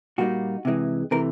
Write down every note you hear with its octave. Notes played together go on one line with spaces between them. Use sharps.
A#2 G3 A#3 D#4 F#4
C3 E3 G#3
C3 E3 A3 A#4